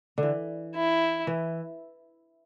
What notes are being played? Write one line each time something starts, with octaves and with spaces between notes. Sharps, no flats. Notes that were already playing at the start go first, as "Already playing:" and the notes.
D3
E3
E4
E3